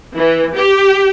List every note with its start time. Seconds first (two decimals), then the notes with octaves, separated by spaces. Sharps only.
0.16 E3
0.54 G4